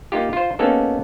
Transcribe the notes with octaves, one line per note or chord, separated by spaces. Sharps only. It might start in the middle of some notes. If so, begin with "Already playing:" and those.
A#3 D#4 F4 G4
F4 C5
A#3 B3 C#4 D#4 G4 A4